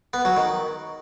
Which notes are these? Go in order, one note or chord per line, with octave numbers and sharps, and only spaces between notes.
B3
F#3
D#3